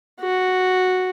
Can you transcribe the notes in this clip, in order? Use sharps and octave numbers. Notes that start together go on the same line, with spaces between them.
F#4